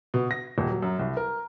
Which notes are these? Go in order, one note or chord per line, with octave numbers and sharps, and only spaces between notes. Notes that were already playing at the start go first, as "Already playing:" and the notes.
B2
A#6
D#1
F#3
F#2
C2
A#4